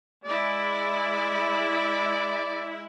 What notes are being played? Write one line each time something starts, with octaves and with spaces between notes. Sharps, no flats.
G#3 E4 D5